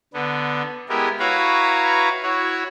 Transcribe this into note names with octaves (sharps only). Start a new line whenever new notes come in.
D3 B3
G#3 B3 E4 G4 A#4
E4 F#4 B4 C#5 F5 A#5
E4 F#4 C#5